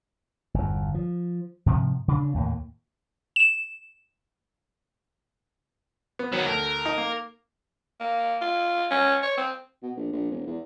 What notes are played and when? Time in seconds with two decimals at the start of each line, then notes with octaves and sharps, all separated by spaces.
0.54 G1 E2
0.94 F3
1.66 G#2 C3 F3
2.08 C#3 D4
2.34 D#2 A2 A#3
3.36 E7
6.19 B3
6.32 D#3 F#3 B3
6.46 D2 A#4
6.86 D#4
6.98 A#3
8.00 A#3
8.41 F4
8.91 C#4
9.23 C#5
9.37 C4
9.83 B2
9.97 A#1
10.13 A#1
10.31 E1
10.46 E2